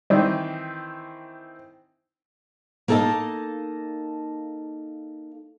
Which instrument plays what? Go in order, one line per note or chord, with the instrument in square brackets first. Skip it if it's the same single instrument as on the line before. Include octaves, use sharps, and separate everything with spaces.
[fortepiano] D#3 E3 C4 [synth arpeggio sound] G3
[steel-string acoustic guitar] A#3 D#4 A4 D#5 A5